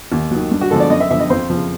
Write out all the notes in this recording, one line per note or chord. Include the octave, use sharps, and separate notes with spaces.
D#2
D#3 F#3
G2
F#4
D3 F3 G#3 A4
D5
F#2 D#5
E5
D3 F3 E5
D#5
F2 C5
C#3 F3